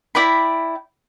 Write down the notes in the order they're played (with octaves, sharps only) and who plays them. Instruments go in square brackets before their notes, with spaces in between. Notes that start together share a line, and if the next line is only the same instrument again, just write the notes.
[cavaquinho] E4 D5 G5 B5